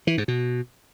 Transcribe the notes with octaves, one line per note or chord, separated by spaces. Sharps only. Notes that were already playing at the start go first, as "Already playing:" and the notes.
E3
G#2
B2